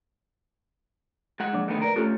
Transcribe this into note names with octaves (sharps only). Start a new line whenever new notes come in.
G#3 F#5
F3 A#3 D4
D3 D#3 A3 B3
A#4 B4 D5
A3 C#4 F4 G4 A4